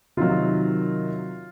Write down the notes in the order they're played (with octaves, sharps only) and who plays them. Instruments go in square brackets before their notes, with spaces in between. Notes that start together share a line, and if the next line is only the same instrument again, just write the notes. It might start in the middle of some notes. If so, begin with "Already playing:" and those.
[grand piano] C3 D#3 F#3 F4